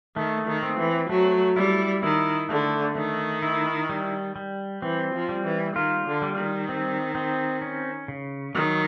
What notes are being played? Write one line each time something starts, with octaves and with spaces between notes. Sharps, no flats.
D#3 A3
D#3
C4
E3
F#3 A3
G3 E4
D#3 E4
D3 A3
D#3 A3
E4
G3
G3
E3 C4
F3
G3
E3
D#3 F4
D3
G3
D#3
C4
C4
C#4
C#3
D#3 F#3